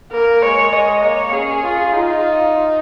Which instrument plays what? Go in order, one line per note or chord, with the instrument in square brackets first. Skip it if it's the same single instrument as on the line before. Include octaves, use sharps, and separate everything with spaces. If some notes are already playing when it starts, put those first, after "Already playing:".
[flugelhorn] A#3 [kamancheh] A#4
[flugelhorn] G#3 [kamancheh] C#5
[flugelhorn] G#3 [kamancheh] D#5
[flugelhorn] A#3 [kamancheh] C#5
[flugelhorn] C#4 [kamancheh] G#4
[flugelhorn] F4
[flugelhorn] D#4 [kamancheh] F4